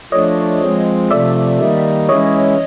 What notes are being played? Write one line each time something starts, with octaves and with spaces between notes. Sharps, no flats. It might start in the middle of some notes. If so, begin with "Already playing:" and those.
F3 A3 D4 C#5 D#5
F3 G#3 C4
C3 F3 A3 D5 E5
D#3 G3 A#3 D#4
E3 G#3 C#4 E4 C#5 D#5